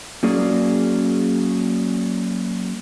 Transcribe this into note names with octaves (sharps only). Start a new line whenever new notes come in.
F#3 A#3 C#4 G#4 D5